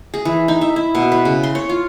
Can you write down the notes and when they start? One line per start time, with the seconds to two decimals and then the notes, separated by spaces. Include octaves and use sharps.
0.14 G#4
0.25 E3
0.48 D#4
0.61 E5
0.76 E4
0.95 B2
1.12 B4
1.25 C#3
1.43 C6
1.55 C#5
1.69 F4